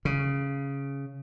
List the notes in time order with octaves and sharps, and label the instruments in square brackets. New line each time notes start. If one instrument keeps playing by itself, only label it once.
[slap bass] C#3